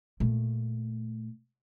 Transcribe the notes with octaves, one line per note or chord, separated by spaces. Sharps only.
A#2 A3